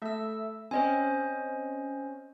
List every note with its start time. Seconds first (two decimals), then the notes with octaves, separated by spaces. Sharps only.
0.02 A3 A4 E5 E6
0.71 C4 C#4 C5 D#5 G#5